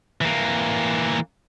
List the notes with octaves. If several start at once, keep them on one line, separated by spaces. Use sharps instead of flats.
E3 A#3